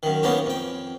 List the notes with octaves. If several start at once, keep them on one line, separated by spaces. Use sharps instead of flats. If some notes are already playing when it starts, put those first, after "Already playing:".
F#2 D#3
A#3 B3 C#4 D#4 G4
F2 G5